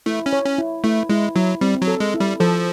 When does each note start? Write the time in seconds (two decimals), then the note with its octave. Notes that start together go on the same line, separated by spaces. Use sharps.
0.06 A3 E4
0.26 C#4
0.33 C#5
0.46 C#4
0.58 E4
0.84 A3 E4
1.10 G#3 E4
1.35 F#3 E4
1.61 G3 C4
1.82 F#3
1.88 A4
2.00 G#3
2.14 E4
2.20 G3
2.40 F3 A4